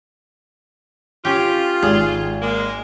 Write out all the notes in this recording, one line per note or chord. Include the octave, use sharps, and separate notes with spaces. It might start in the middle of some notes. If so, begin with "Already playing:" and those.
C#4 F4 G4
G#1 G#4
G#3 A#3